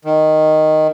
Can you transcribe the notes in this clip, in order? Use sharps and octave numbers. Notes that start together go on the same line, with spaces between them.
D#3